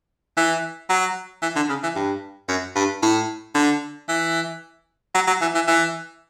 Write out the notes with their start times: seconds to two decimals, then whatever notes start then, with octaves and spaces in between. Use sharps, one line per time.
0.37 E3
0.89 F#3
1.42 E3
1.56 D3
1.69 C#3
1.83 E3
1.96 G2
2.48 F#2
2.75 G2
3.02 A2
3.55 D3
4.09 E3
5.15 F#3
5.27 F#3
5.41 E3
5.55 E3
5.67 E3